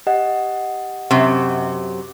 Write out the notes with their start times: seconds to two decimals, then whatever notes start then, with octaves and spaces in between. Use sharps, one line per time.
0.07 G4 D#5 F#5
1.11 F#2 C3